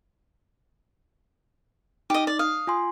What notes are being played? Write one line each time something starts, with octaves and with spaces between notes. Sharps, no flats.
D#4 G4 D#5
D5
F5 D#6
F4 G#5 C6